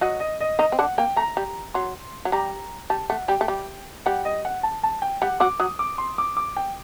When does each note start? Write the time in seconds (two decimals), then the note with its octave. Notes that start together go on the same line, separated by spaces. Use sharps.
0.01 F#3 F#4 D#5
0.20 D#5
0.41 D#5
0.59 D#3 D#4 D#5
0.72 C4
0.79 D3 D4 F#5
0.98 A#3 G5
1.16 A3 A#5
1.37 G3
1.74 F#3 C6
2.25 F#3
2.32 G3 A#5
2.90 G3 A5
3.10 A3 F#5
3.28 G3 G5
3.41 A3
3.48 G3
4.06 G3 F#5
4.25 D#5
4.45 F#5
4.63 A5
4.83 A5
5.02 G5
5.22 G3 F#5
5.40 F#3 F#4 D6
5.60 F#3 F#4 D#6
5.79 D6
5.98 C6
6.18 D6
6.37 D6
6.56 G5